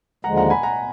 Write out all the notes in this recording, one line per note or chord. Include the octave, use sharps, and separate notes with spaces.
D#2 D3 F3 G#3 F#5 A#5
F#5 A#5
G#5 B5
F#5 A#5